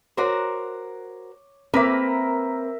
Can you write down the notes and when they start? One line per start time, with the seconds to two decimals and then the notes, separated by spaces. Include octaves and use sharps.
0.17 F#4 A#4 C5 C#5 D6
1.74 A#3 C4 A#4 B4 E5